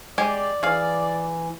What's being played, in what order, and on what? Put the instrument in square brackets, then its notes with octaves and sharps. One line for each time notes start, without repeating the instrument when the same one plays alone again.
[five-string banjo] G#3 G4 G#5 [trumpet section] D5
[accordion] E3 [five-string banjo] G#4 F5